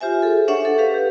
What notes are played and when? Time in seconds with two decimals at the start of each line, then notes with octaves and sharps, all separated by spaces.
0.01 F4 G4 C5 E5 G#5
0.22 G#4 A4
0.48 D4 C5 C#5 E5 F#5 C#6
0.65 A4
0.78 G4 B4 F5
0.94 G4